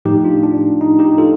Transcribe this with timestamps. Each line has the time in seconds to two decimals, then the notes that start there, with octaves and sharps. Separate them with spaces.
0.05 A2 F3 A3 D#4 G4
0.25 D4 F4
0.43 D4
0.81 D#4
0.99 D#4 G4
1.18 F4 A4